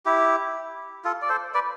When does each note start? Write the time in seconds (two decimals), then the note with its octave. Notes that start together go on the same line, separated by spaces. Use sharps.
0.06 E4 G4
1.05 F4 A4
1.22 D5
1.29 A4 C5
1.54 B4 D5